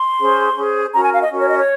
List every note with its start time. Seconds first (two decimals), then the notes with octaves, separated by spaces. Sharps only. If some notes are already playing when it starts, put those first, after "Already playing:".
Already playing: C6
0.20 C#4 G#4 C5
0.57 C#4 G#4 C5
0.94 C#4 F#4 A#4 A#5
1.03 G#5
1.13 F5
1.22 D#5
1.30 C#4 F#4 A#4
1.39 C#5
1.49 D#5
1.58 C#5